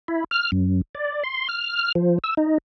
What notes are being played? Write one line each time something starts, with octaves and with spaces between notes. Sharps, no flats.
E4
F6
F#2
D5
C6
F6
F3
E6
D#4